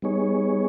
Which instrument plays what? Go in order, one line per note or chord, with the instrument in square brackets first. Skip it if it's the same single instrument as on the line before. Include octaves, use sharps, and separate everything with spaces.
[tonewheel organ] G3 B3 D#4 G#4 C#5